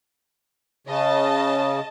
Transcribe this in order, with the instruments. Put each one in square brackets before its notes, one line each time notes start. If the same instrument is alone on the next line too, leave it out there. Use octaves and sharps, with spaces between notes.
[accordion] C#3 [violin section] D#5 A5